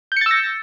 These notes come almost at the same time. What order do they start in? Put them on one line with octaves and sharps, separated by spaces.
G6 C#7 A6 E6 A#6